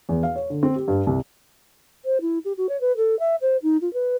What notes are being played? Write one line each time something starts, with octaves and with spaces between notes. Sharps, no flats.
E2
F5
C#5
D3
C4
G4
G2
C2
C5
E4
G4
F#4
C#5
B4
A4
E5
C5
D#4
F4
B4